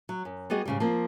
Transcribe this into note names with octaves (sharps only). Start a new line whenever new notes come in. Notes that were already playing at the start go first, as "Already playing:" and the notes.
F#3
F#2
G3 B3 F#4 G#4 D#5
G#2 C#3 G3
F3 A#3 C4